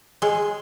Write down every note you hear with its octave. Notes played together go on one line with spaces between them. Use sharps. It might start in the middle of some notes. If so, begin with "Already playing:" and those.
G#3 G#4